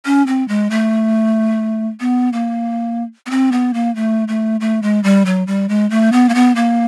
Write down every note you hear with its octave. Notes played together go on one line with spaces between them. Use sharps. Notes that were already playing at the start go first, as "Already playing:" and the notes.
C#4
C4
G#3
A3
B3
A#3
B3
C4
B3
A#3
A3
A3
A3
G#3
G3
F#3
G3
G#3
A3
B3
A#3
B3
A#3